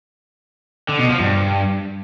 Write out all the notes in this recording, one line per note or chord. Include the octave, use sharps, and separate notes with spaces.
D3
B2
F3
G2